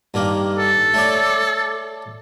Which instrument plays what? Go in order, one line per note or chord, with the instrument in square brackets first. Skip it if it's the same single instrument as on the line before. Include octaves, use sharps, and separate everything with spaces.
[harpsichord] G2 D#3 A#3
[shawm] A4
[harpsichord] A3 C#5 D5